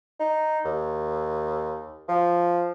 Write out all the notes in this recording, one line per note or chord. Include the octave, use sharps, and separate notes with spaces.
D#4
D#2
F3